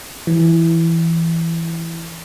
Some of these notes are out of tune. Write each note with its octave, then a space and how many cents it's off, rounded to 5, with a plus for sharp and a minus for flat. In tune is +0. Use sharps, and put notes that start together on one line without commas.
E3 +5